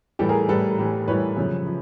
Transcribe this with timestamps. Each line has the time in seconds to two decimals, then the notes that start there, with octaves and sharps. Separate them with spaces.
0.19 A2 E3 G3 G4 A4
0.29 G#4 A#4
0.48 A2 E3 G3 A4 B4
0.78 A2 E3 G3
1.08 A2 E3 G3 B4 C#5
1.37 F#2 C#3 F3
1.66 F3